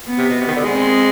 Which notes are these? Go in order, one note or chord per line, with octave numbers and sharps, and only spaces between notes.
B3
C3
B2
C3
D#3
D3
G#3
C4